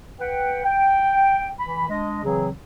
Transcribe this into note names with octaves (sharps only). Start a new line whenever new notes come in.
B4 F#5 G5
G5
E3 B5
G#3 D4 D#5
C#3 E3 F#3 C4 G#4